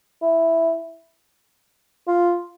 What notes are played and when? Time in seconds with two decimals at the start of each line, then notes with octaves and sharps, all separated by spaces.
0.22 E4
2.07 F4